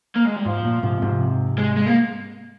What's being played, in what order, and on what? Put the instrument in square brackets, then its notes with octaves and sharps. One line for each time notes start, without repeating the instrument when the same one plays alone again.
[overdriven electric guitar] A#3
G#3
G3
[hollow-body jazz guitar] G#2 [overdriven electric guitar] F3
[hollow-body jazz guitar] A#2
G#2 C3
G#2 C3
[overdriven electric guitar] G#3
G#3
A#3